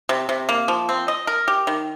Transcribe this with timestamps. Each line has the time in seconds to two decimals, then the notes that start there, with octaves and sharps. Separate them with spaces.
0.09 C3
0.29 C3
0.49 A#3
0.68 F3
0.89 C4
1.08 D#5
1.27 A#4
1.48 G4
1.67 D#3